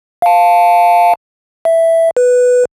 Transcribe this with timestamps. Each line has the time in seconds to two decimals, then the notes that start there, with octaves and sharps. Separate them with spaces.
0.22 F5 A5
1.65 E5
2.17 B4